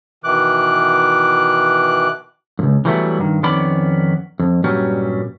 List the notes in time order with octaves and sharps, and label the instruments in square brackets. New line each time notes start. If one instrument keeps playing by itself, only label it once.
[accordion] B2 D#3 E3 D6 F#6
[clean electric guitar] C#2 F#2
E3 F#3 G3 A3 B3 E4
G2 D#3
F2 D#3 B3 C#4 D5 B5
F2
G2 A#2 F#3 G3 C#4